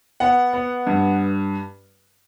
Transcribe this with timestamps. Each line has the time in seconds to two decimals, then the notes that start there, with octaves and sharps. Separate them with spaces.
0.20 B3 F#5
0.53 B3
0.87 G2